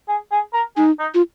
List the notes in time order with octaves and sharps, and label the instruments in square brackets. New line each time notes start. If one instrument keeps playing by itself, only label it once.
[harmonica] G#4
G#4
A#4
[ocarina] D#4 [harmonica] G#4
[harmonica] D#4
[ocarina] F4